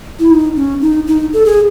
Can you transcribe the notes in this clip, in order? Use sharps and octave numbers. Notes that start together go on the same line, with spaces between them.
E4
D#4
C#4
D#4
D#4
A4
G#4